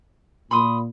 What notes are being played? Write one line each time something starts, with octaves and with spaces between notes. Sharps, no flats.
A#2 B5 C6 D#6